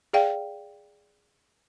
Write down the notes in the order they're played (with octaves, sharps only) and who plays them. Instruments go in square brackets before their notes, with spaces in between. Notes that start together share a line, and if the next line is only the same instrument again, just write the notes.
[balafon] G#4 D5 F5 G5